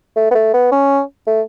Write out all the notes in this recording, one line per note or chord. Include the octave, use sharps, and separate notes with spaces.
A3
B3
A3
B3
C#4
A3